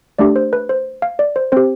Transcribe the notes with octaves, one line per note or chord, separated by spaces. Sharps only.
A3 D4 G4 D5
C5
B4
C5
F5
D5
C5
C4 G4 C5